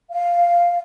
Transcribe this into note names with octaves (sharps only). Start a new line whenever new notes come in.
F5